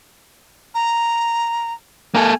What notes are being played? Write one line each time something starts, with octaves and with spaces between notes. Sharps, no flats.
A#5
A#3 A4 G#5